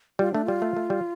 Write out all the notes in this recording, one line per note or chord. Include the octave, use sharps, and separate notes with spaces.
G3 F4
A3 D4
G3 F4
A3
A3
G3